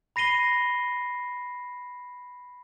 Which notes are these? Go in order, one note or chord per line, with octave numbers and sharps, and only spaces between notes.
B5 A#6 C7 D#7 G7